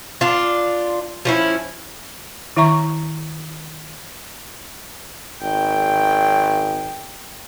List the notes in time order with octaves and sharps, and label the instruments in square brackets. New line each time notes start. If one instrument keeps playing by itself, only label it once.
[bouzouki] D4 F4
F3 C#4 E4
[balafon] D#3 E4 E5 A#5 C#6
[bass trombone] G#1 [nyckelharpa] G5